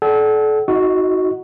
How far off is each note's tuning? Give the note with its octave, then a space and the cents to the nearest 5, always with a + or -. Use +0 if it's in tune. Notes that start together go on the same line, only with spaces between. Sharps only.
A4 -35 D5 -5 F#5 +35
D#4 +35 F#4 +0 D#5 -5